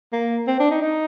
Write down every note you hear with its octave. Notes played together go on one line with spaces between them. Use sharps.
A#3
C4
D4
D#4
D#4